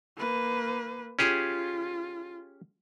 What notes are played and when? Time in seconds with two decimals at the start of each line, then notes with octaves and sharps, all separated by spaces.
0.17 A#3 B4
1.19 C#4 F4 G4 G#4